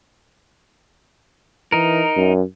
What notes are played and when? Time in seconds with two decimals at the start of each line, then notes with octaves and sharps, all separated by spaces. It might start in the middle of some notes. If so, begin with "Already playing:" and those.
1.72 E3 D#4 A#4
2.16 F#2